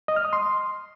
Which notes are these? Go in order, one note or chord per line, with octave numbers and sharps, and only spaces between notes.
D#5
F6
D#6
C6